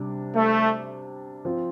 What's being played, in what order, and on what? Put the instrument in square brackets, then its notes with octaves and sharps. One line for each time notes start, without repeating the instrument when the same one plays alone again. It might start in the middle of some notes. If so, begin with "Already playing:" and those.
Already playing: [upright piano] C3 G3 D4
[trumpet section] A3
[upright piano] F3 C4 F4